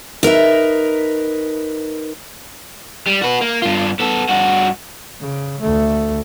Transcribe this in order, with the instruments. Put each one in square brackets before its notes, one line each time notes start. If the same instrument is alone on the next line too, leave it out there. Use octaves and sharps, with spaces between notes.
[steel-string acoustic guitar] D#4 A#4 B4 E5
[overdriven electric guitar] G3
F#4 B4
A#3
G2 F4
B3 A4
G2 F#4
[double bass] C#3
D2 A3